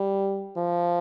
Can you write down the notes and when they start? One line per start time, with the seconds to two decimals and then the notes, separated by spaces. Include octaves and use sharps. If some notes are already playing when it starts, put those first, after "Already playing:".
Already playing: G3
0.57 F3